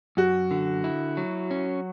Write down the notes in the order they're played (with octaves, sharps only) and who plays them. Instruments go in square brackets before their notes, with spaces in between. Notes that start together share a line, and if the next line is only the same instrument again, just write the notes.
[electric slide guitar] F#2 [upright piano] F#4
[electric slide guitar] D3
E4
F#3
C#4